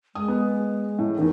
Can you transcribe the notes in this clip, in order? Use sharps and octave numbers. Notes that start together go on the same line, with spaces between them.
G#3 D#6
B3
A2
G#1 E2 D#4